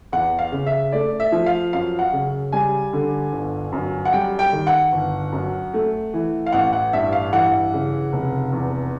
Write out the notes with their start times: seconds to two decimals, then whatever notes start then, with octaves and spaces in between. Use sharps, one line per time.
0.13 E2 F#5
0.39 F5
0.52 C#3
0.67 E5
0.92 A3 D5
1.20 E5
1.32 F3
1.46 F5
1.73 F#2 F5
1.99 F#5
2.13 C#3
2.52 G3 G#5
2.93 D3
3.32 G1
3.72 F#2
4.05 F#5
4.13 G3 G5
4.39 G5
4.53 D#3
4.67 F#5
4.92 G1
5.32 F#2
5.74 A3
6.14 E3
6.46 F5
6.52 A1 F#5
6.73 F#5
6.93 G2 E5
7.13 F5
7.33 E3 F#5
7.73 C#3
8.13 F1
8.53 E2